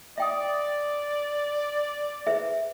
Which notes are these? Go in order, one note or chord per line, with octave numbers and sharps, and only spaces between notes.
D5 E5 G5 D#6
G#4 B4 C5 E5